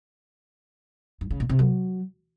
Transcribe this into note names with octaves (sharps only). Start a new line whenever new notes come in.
G2
C#3
A#2
C3
F#3